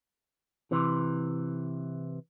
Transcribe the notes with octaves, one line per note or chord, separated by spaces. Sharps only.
C3 E3